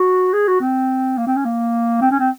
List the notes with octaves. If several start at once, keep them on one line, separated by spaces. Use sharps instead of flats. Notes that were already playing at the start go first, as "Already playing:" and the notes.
Already playing: F#4
G#4
F#4
C4
A#3
C4
C#4
A#3
C4
C#4
C4